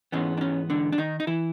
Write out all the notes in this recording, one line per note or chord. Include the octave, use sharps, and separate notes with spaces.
G#2 E3 G#3 B3 C#4
D4
C#4
D3 D4
D4
D#3 D#4
D#4
E3 E4